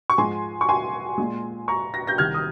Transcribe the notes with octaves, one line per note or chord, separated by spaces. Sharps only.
C#6
G#2 F3 G#3 G#5 C6
C#6
G#5 C6
A#2 G#3
A#5 C#6
A#6
G6 A#6
C2 C3 D#3 F6 G#6
D#6